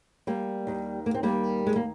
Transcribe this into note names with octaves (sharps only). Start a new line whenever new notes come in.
G3 A#3
D#2 D#3
A#3
C4
G3 A#3
G#3
A#3